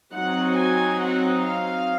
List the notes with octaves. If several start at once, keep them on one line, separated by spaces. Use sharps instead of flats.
F#3 C4 D#4 F#5
G#5
F#5
F5